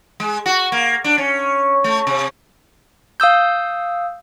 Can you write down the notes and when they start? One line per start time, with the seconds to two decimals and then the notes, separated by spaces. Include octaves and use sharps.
0.20 G#3
0.46 F#4
0.72 A#3
1.04 D4
1.18 C#4
1.84 A3
2.07 C3
3.20 F5 D#6 E6 G6